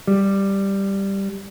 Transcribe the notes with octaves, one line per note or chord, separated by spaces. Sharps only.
G3